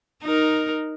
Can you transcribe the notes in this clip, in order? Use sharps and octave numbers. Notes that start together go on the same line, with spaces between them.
D#4 A#4